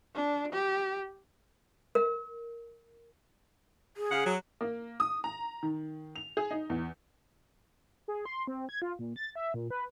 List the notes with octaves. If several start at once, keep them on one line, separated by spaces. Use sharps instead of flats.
D4
G4
A#4
G#4
C#3 F5 F#5
F#3
A#3
D#6
A#5
D#3
F7
G#4
D#4
E2
G#4
C6
C4
G#6
F4
A#2
A6
E5
A#2
B4